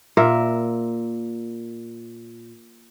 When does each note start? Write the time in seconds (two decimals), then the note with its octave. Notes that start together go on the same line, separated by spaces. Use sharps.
0.17 A#2 A#4 E5